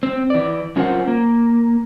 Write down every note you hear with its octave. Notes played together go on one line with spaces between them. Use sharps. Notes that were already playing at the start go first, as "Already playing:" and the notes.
C4
E3 D5
F#2 C#4 F4 A#4 C5 F#5
A#3